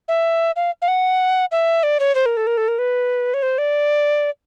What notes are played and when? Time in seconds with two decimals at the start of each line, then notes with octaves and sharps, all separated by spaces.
0.08 E5
0.56 F5
0.82 F5
0.88 F#5
1.52 E5
1.83 D5
2.00 C#5
2.15 C5
2.26 A#4
2.37 A4
2.47 A#4
2.57 A4
2.68 A#4
2.79 B4
3.34 C#5
3.43 C5
3.58 D5